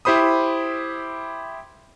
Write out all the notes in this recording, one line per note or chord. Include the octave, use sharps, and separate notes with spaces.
E4 G4 C5 B5 D#6